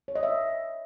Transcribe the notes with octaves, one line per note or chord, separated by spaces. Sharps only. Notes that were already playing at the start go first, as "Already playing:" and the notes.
C#5
D#5
E5